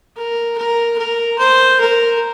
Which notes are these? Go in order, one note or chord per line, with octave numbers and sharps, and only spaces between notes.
A#4
A#4
A#4
C5
A#4